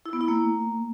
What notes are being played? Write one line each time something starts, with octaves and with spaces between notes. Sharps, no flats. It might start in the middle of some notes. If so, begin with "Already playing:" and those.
E4
B3
E4
A#3